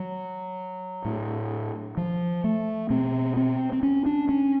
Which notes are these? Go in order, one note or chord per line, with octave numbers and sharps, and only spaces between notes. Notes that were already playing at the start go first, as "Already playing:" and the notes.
Already playing: F#3
A2
F3
A3
B2 C4
C4
C4
C#4
D4
C#4